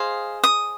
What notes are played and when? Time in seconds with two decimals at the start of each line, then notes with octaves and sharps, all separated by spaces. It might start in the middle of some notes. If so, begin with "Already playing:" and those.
Already playing: G#4 C5 D#5 F5
0.44 D#6